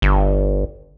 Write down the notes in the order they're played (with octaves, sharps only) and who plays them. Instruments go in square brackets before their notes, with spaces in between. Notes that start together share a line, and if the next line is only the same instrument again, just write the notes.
[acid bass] G1